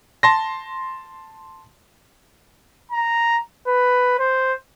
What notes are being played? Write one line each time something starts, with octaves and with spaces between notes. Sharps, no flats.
A5 C6 A#6
A#5
B4
C5